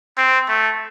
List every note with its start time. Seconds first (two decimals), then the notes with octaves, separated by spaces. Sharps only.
0.18 C4
0.48 A3